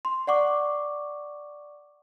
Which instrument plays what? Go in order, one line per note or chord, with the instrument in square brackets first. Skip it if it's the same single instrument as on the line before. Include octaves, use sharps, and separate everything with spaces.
[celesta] C6
D5 F#5 C#6 D6